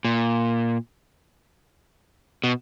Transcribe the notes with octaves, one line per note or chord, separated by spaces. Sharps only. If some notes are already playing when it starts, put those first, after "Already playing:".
A#2
B2